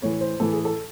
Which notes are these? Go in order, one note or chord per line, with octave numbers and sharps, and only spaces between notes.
A2 E3 C#5
C5
A2 E3 A4
G#4
A4